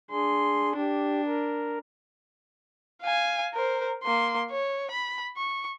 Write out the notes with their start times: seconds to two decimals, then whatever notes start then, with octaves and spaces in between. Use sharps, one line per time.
0.11 D4 G#4 C6
0.77 D4 G4
1.27 A#4
3.02 F5 G#5
3.54 A#4 C5
4.03 A#3 C6
4.50 C#5
4.91 B5
5.37 C#6